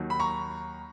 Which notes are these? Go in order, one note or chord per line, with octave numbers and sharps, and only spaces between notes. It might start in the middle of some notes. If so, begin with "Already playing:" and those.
Already playing: D#2 D#3 F#3
B5
A#5 C#6